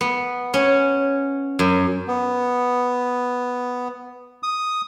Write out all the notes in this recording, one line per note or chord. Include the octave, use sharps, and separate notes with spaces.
B3
C#4
F#2
B3
D#6